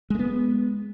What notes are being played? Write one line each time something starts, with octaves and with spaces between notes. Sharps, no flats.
G#3 A3 B3